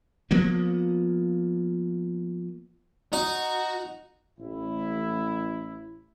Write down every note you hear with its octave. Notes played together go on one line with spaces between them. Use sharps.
F3 A#3 B3
D#4 F#4
A1 E4